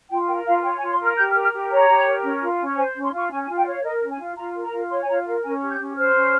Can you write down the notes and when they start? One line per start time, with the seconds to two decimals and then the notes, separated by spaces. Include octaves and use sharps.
0.10 F4 G5
0.28 A#4 G5
0.46 F4 F5
0.63 C#5 G5
0.77 G#5
0.82 F4
0.91 C6
0.99 A#4 F6
1.17 G4 G6
1.30 F6
1.34 A#4
1.43 F6
1.52 G4
1.70 C#5 A#5
1.88 G4
2.06 A#4
2.23 C#4
2.41 F4
2.59 C#4
2.77 C5 G#5
2.95 C#4
3.03 C6
3.12 F4 C#6
3.30 C#4 G#5
3.43 G#5
3.48 F4
3.57 G5
3.66 C#5 F5
3.84 A#4 D#5
4.01 C#4
4.10 G#5
4.19 F4
4.37 F4 A#5
4.54 A#4
4.64 A#5
4.72 F4
4.90 C#5 C6
5.01 G#5
5.08 F4 A#5
5.26 A#4 F5
5.43 C#4 G#5
5.61 G4
5.70 G6
5.79 C#4
5.97 C5 F6
6.14 C#4